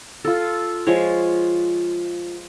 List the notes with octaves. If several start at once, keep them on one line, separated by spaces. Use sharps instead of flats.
F4 A4
F3 G#3 F4 C#5